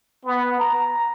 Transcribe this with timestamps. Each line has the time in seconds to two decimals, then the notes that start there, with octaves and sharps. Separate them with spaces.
0.25 B3
0.59 A#5